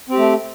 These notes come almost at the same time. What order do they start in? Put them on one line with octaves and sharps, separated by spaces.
C4 G4 A3